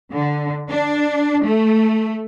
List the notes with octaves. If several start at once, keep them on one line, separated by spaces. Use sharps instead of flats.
D3
D4
A3